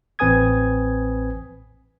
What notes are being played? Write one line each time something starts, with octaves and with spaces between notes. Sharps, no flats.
A1 C4 B4 G#5 D#6 G#6